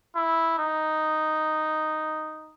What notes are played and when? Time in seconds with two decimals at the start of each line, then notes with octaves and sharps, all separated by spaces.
0.16 E4
0.58 D#4